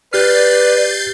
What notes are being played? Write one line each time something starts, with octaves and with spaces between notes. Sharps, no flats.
G4 B4 D5 F6 G6 A6 C7